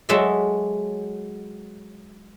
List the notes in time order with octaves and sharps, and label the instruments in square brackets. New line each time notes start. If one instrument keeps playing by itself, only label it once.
[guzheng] F#3 G#3 A4 D#5 E5